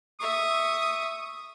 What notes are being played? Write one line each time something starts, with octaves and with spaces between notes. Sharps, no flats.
E5 C#6 D#6